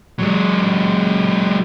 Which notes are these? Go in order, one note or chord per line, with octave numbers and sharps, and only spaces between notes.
F#3 G#3